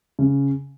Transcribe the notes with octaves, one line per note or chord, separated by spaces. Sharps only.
C#3